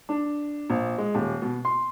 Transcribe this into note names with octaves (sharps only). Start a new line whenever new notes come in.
D4
A#1
G#3
D#1
B2
C6